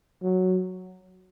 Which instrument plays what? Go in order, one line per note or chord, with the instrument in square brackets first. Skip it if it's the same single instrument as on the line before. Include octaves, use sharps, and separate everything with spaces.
[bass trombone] F#3